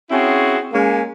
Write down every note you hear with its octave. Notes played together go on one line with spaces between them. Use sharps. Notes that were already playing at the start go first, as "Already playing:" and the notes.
C4 C#4 E4 F#4 G#4
G#3 A#3 C#4